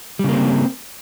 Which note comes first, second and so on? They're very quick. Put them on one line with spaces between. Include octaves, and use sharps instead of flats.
G3 C#3 A#3 C4